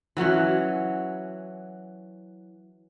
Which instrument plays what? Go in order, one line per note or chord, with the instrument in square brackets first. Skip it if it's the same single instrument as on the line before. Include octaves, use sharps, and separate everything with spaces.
[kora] E3 F#3 C#4 F#4